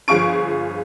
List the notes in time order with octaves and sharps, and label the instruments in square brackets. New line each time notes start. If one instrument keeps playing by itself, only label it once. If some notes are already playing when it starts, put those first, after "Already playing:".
[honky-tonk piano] G1 F3 G#4 F5 C#6 D7